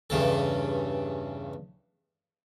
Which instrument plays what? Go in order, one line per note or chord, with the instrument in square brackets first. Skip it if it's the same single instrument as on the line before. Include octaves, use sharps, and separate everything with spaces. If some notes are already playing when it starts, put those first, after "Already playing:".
[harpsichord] E2 G2 C#3 A4